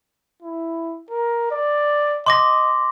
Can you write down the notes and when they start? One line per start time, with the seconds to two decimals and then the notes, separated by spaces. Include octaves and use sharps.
0.42 E4
1.10 A#4
1.51 D5
2.26 D#5 C6 D6 A#6